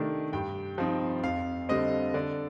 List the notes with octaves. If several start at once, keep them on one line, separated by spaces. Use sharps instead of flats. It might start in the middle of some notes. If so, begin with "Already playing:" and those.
Already playing: C3 D#3 A3 D4
G2 G5
F3 C4 D#4
F2 F5
D3 G3 C4 D#5
D3 D5